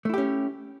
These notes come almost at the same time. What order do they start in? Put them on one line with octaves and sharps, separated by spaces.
A3 E4 G4 C#4